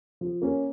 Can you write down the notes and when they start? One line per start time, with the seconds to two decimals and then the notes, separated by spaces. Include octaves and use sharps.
0.21 F3
0.42 A#3 C#4